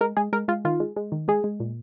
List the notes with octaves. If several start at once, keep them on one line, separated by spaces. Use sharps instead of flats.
G#3 A#4
G#3 G#4
G#3 A#4
G#3 F4
D#3 F4
G#3
G#3
D#3
G#3 G#4
G#3
A#2